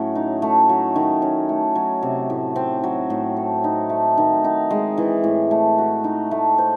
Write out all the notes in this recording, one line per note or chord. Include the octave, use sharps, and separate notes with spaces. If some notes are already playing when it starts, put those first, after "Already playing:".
Already playing: A2 F#3 A3 C#4
D#4
A3
F#3
D#3
C#4
A3
F#3
C3
A2
C4
F#3
A2
A4
D#4
A3
D#3
D#4
G#3
E3
A2
A3
F#4
D#4
A3
C5